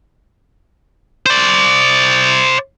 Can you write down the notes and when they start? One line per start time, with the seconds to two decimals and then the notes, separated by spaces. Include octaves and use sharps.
1.26 C5 D5